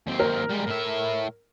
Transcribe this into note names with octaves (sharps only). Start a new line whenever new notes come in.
D#2 C4
A#4
G3 G#3
A2 E5